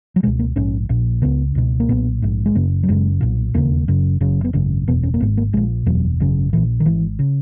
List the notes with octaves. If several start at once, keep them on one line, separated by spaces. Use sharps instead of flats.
F#3
C#2 B2 G#3
A#3
A#1 G#2 C#4
A#1 A#2
C#2 C#3 B3
C#2 B2
A#3
B1 A#2 B3
A#1 G#2
G#3
F#1 F#2 C#3 A#3
F#3
F#1 F#2 C#3 G#3
B1 A#2
E1 D#2 C#3 A#3
F#1 F#2 C#3
F#1 F#2 C#3
B3
G#1 F#2 C#3 C#4
F#1 E2 B2 B3
C#4
A#3
G#1 G#2 B3
A#3
A#1 A#2 G#3
F#1 E2 B2 F#3
G#1 F#2 C#3
A#1 A#2 E3
D#3
G#1 G#2 E3
C#3